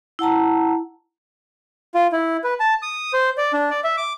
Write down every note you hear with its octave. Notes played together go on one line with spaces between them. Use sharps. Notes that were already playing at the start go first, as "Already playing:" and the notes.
E4 F#5 A5 A#5
F4
E4
B4
A5
D#6
C5
D5
D4
D5
E5
D6